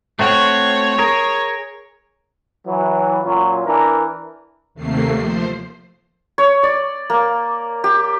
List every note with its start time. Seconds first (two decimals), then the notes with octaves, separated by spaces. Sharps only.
0.19 A3 C4 F#4 C#5
0.98 G#4 A#4
2.66 E3 F#3
3.22 A#2 F#3 C#4 F4
3.65 E3 D4 A#4
4.74 D#2 C3 A3 A#3 C7
5.18 F3 C5
6.38 C#5
6.63 D5
7.10 A#3
7.84 G4